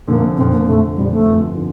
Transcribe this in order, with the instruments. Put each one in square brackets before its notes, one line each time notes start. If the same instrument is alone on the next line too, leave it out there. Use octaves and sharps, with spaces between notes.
[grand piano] F1 F2 D3 [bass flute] A#3
[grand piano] F1 F2 D3 [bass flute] C4
[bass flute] A#3
[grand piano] F1 F2 D3 [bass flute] A3
[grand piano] F1 F2 D3 [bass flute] G3
[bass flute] A3
[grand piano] G1 F2 D3 F3
D3 F3